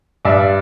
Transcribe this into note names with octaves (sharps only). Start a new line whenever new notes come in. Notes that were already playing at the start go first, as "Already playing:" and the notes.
G2 D5 E5